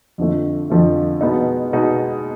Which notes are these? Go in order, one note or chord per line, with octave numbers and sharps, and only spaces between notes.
F2 D3 F3 A3
F2 D3 F3 A3
B2 G#3 B3 D#4
B2 G#3 B3 D#4